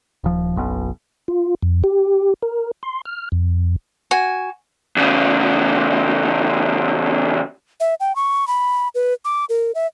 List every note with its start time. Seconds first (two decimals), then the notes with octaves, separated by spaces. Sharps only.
0.24 D#1 F3
0.56 F#1 B1 B2
1.28 F4
1.62 F2
1.84 G4
2.42 A#4
2.83 C6
3.05 F6
3.32 F2
4.11 F#4 G#5
4.97 E2 C#3
7.80 E5
8.00 G5
8.16 C#6
8.48 B5
8.95 B4
9.25 D6
9.49 A#4
9.75 E5